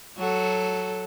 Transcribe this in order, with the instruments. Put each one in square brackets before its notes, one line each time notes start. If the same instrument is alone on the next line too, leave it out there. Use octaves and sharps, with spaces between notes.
[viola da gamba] F#3 F#4 A4